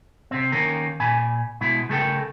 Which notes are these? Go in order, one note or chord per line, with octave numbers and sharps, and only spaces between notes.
C3 C4
D#3 A#3 C#4 A#4
A#2 G#5 B5
B2 G#3 E4
C#3 A3 G4 A4 A#4 G5